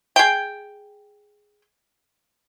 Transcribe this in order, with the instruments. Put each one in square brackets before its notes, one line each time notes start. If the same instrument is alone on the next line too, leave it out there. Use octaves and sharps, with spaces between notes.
[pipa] G#4 G5